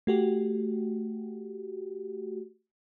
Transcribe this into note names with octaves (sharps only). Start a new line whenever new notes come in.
A3 F#4 G4